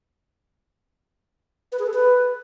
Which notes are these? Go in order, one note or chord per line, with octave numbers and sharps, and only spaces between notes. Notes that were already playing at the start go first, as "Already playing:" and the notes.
B4
G#4
A4
B4